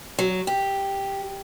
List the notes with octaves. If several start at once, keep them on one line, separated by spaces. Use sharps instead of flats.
F#3
G4